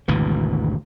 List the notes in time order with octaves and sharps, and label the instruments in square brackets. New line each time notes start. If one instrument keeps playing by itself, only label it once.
[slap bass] G#1 D2 B2 E3